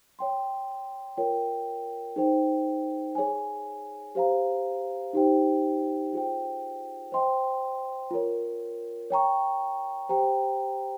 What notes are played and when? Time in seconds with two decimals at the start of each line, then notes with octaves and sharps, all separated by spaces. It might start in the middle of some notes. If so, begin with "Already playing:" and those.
0.19 C#5 G5 C6
1.17 F4 A#4 C#5 G5
2.16 D#4 G#4 C5 G5
3.15 G#4 C#5 G#5
4.15 G4 C5 F5 A#5
5.13 D#4 G4 C5 G5
6.13 F4 G#4 C5 G5
7.12 C5 D#5 G5 C6
8.11 F4 A#4 C#5
9.10 C#5 G5 A#5 C#6
10.09 G4 C5 G5 A#5